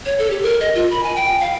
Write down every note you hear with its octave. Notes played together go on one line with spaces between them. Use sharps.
C#5
A4
G4
A#4
D#5
F4
B5
G#5
G5
F5